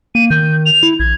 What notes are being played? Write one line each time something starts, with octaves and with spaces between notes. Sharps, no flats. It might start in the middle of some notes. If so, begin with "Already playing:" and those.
A#3 D#7
D#3 G6
F7
E4
A#1 G#6